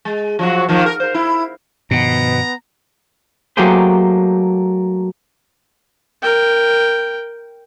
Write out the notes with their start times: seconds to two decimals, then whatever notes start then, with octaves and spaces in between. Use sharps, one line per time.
0.05 G#3
0.39 F3 F#3 F#4
0.69 D#3 F3 A#3
0.86 A#4
1.00 A#4 C5
1.14 E4
1.91 G2 B2 D#3 F3 B3 A#5
3.57 F#3 A3 A#3 G4 G#4 C5
6.23 A#4 G5